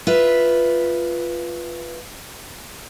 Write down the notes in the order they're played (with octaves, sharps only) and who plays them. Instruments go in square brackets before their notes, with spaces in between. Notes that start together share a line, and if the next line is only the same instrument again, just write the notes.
[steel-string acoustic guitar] F4 B4 E5